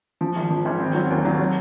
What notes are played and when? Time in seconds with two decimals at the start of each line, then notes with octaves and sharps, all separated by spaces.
0.21 F3
0.36 G#1
0.50 F3
0.65 G#1
0.80 C4
0.95 F#3
1.10 D#2
1.25 F#3
1.39 F#3